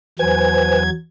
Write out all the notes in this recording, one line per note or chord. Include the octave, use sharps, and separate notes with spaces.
E2 F#3 B4 C5 G#5 G#6